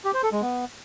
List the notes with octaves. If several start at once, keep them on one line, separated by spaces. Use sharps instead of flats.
G4
C5
A4
G#3
B3